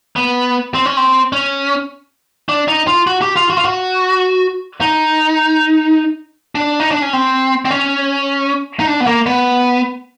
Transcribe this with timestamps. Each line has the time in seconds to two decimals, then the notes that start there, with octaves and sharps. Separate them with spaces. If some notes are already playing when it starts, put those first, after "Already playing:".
0.16 B3
0.74 C4
0.86 C#4
0.97 C4
1.33 C#4
2.49 D4
2.68 D#4
2.87 F4
3.07 F#4
3.22 G4
3.36 F4
3.50 F#4
3.57 F4
3.65 F#4
4.81 D#4
6.55 D4
6.80 D#4
6.91 D4
7.02 C#4
7.13 C4
7.65 C4
7.71 C#4
8.80 D#4
8.87 D4
9.00 B3
9.07 A#3
9.26 B3